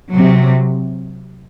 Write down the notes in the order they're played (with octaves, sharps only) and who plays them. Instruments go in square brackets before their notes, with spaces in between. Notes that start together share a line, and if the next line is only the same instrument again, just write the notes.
[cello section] C3 F#3